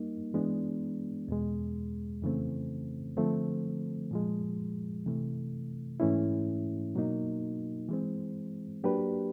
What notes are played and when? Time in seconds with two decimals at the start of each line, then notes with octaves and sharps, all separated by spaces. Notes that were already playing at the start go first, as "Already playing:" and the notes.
Already playing: G3 A#3 D#4
0.34 E3 G#3 B3 D4
1.28 E2 B2 G#3
2.22 F2 C#3 E3 A3 C4
3.17 D3 F3 A3 C4
4.11 A#2 F3 G#3
5.06 C3 E3 A3
6.00 G#2 E3 A3 C#4 E4
6.95 B2 F#3 A#3 D#4
7.89 E3 G#3 C4
8.84 F#3 A#3 D4 G4 B4